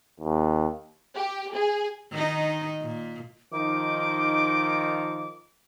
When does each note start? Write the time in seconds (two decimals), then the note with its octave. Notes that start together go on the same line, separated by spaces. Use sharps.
0.20 D#2
1.16 G4
1.53 G#4
2.12 D#3 D#4
2.81 A#2
3.52 D#3 F3 D#4 D6